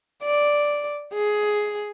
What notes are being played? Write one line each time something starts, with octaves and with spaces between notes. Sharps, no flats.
D5
G#4